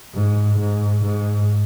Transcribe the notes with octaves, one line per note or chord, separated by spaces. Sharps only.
G#2
G#2
G#2